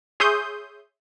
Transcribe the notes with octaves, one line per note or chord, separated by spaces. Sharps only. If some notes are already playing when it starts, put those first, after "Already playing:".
G#4 C#5 E5 C6 D#6 G6